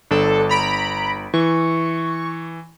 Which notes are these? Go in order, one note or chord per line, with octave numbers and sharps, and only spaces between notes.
G1 D4 A4
A#5 B5 D7
E3 C#6